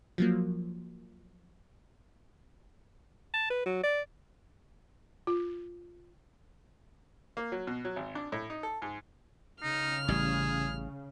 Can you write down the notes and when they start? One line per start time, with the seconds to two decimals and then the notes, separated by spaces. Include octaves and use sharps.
0.18 F3 F#3 A#3
3.34 A5
3.50 B4
3.66 F#3
3.84 D5
5.27 F4
7.37 A#3
7.52 F#3
7.67 B2
7.85 F#3
7.96 G#1
8.15 D4
8.32 A2
8.50 D#4
8.63 A4
8.82 G#2
9.63 C#3 D#4 F6
10.08 A1 G3 G#4